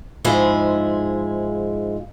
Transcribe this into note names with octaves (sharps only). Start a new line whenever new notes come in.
G#2 F3 G#3 E4 G#4